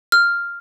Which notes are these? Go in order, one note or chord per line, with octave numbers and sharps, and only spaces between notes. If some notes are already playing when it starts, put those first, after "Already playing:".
F6